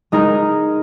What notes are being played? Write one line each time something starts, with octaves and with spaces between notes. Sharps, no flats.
G#3 D#4 G#4 A#4